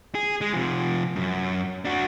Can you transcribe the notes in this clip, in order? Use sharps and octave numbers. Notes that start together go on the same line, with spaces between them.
G#4
G#3
C3 F3
F#2
D4 F#4